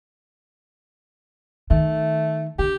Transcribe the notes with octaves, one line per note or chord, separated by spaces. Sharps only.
D#3 A3
D3 G4